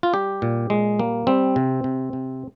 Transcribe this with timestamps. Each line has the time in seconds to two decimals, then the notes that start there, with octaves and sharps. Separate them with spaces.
0.03 F4
0.14 G3 G4
0.42 A#2
0.70 A#2 G#3
0.99 G3 A#3
1.27 G3 C4
1.56 C3
1.84 C3
2.13 C3